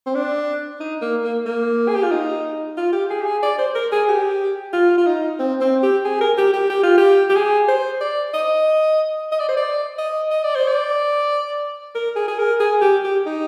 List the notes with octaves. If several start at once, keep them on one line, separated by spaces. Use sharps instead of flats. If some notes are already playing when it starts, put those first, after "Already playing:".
C4
D4
D#4
A#3
A#3
A#3
G#4
G4
F4
D#4
F4
G4
G#4
G4
G#4
D5
C5
A#4
G#4
G4
F4
F4
D#4
C4
C4
G4
G#4
A#4
G4
G4
G4
F4
G4
G4
G#4
C5
D5
D#5
D#5
D5
C5
D5
D#5
D#5
D5
C5
D5
A#4
G#4
G#4
A#4
G#4
G4
G4
D#4